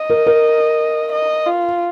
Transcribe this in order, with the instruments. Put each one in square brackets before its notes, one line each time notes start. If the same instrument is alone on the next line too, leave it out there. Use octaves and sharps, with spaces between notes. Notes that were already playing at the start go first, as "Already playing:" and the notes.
Already playing: [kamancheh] D#5
[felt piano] A#4
A#4
[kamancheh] D#5
F4